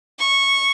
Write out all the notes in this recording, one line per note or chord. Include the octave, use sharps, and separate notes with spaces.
C#6